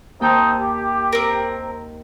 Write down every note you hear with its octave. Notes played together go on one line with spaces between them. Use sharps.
D#2 C4 D#4 G5 A5
G4
C4 A#4